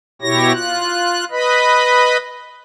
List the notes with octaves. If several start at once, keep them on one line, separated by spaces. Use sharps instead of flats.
B2 E4 G4 C#5 A#6
F4 F#6
B4 D#5 B5